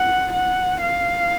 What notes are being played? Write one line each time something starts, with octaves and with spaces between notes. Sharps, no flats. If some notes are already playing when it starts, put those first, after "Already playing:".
Already playing: F#5
F#5
F5